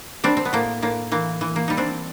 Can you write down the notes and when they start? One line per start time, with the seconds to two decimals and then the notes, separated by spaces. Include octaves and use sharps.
0.24 G3 C4 D4
0.37 C4
0.45 B3
0.53 A2 A#3
0.82 A2 A#3
1.12 E3 A#3
1.41 E3
1.56 A#3
1.68 G3 D#4
1.77 C4 D4